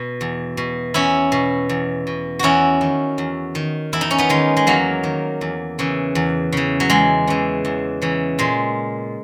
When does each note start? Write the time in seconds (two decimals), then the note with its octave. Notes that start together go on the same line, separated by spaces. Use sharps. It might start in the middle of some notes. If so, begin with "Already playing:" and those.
Already playing: B2
0.21 E2
0.57 B2
0.94 E2 C#4 E4
1.32 B2
1.69 E2
2.07 B2
2.39 E2 C#4 E4 F#4
2.81 D#3
3.18 E2
3.55 D#3
3.93 E2 E4
4.01 D#4
4.11 C#4
4.18 B3 D#4
4.29 D#3 G#3
4.57 G#3
4.67 E2 F#3 A#3
5.04 D#3
5.41 E2
5.79 C#3 E3
6.15 E2
6.52 C#3 E3
6.80 F#3
6.90 E2 G#3
7.27 C#3 E3
7.65 E2
8.02 C#3 E3
8.39 A#2 G#3